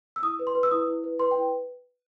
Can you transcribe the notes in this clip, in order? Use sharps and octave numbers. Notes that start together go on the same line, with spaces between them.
E6
E4 D#6
B4
C6
B4
E6
E4 D#6
E4
B4
B4 C6
G5
E4